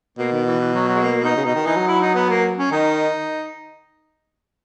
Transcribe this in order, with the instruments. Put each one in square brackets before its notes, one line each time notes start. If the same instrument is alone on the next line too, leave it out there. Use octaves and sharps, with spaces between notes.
[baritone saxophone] B2 [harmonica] A#3
[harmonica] D#3
E3
E3
F#3
F#3
G#3
A#3
D#4
[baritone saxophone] C#3
[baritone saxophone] B2 [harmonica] D#4
[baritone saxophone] D#3
[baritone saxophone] E3 [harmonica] D#4
[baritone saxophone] F#3
[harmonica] E4
D#4
B3
A#3
C#4
[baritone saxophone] D#3 [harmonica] D#4